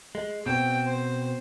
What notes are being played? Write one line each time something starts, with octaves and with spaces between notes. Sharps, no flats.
G#3
B2 C4 G5
C5